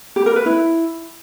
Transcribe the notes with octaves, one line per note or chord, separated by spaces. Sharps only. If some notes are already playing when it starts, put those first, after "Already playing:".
G4
A#4
B4
E4